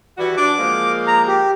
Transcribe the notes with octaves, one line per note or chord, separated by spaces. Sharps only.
E3 G3 F#4
D4 F#4 D6
F3 G#3 A#3
A#5
G4